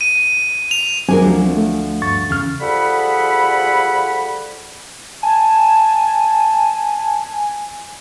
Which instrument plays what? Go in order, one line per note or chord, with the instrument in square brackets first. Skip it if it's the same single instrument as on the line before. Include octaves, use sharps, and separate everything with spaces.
[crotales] D#7
F7
[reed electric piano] F#3 C4 G#5 [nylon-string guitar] D4 G#4 A#4
[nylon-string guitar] D2 F3 D4
[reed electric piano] A3
G2 C#6 A6
[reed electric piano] E2 F6 [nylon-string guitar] C#3
[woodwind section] F3 G3 G#4 A4 F#5 B5
[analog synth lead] G#5 [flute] A5